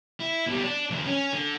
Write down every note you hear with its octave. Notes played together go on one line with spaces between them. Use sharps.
E4
B2 G3
D4
F2 D#3
C#4
D3